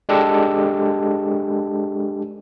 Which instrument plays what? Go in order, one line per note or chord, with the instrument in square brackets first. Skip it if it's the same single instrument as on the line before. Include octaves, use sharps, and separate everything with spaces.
[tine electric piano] G#3 D4 G4 A4